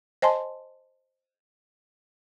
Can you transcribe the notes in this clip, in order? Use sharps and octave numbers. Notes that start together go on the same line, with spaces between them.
C5 D#5 G#5 A5 C6